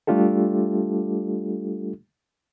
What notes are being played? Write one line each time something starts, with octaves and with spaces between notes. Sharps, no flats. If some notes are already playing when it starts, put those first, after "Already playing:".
G3 A3 D4 F4 G4 A4